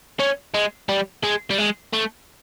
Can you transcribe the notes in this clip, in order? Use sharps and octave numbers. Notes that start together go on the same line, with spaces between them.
C#4
G#3
G3
G#3
G3
G#3
A3